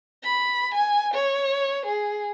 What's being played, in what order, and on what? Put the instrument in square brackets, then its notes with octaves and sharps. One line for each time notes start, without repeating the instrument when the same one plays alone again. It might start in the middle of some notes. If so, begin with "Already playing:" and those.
[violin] B5
G#5
C#5
G#4